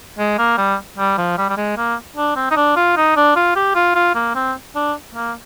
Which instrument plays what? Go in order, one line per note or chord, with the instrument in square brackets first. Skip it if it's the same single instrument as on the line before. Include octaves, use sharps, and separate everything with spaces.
[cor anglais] G#3
A#3
G3
G3
F3
G3
G3
G#3
A#3
D4
C4
D#4
D4
F4
D#4
D4
F4
G4
F4
F4
A#3
C4
D4
A#3